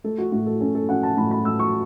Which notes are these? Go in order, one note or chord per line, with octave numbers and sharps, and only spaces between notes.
A3 A4
F#4
A2 F#4
A4
C#4 A4
A4
C#4 F#5
A5
A2 B5
B5
A2 E6
C#6